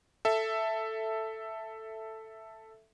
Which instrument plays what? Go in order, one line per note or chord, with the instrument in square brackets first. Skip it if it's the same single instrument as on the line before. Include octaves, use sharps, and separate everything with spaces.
[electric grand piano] A4 E5